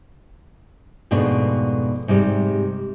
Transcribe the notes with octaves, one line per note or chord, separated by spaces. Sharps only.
F2 G#2 B2 A3 D4
G#2 C3 G3